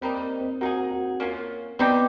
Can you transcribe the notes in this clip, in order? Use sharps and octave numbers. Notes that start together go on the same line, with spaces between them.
G3 A#3 C4 D#4
C4
A#3 D#4 F#4 G#4
F#4
A#3 C#4 F4
G3 B3 C4 D#4 G4